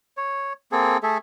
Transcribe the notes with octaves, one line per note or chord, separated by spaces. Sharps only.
C#5
A#3 C4 G#4 A4
A3 G#4 A4 E5